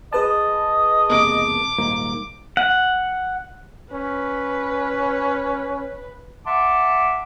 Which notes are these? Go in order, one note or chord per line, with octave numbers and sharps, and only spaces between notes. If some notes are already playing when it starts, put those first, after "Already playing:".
G#4 B4 D#5 A5
E1 C3 A#3 D6
D#1 G#2 A#3
F#5
C#4 B4
E5 F#5 A5 C6 D6